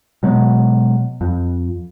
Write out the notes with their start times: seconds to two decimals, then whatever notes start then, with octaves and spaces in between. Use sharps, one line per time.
0.23 B2 F#3 G#3 B3
1.21 F2